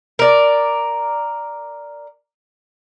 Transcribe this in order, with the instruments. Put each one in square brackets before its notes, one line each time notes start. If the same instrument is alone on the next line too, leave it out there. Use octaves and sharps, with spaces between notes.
[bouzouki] A#4 D5